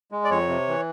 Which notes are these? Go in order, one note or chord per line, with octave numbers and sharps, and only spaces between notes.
G#3
D5
F2 C#5
C3
E3